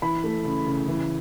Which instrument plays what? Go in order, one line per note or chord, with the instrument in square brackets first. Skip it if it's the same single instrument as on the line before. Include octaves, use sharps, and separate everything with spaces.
[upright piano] E3 B5
A3
C#3
C#3
E3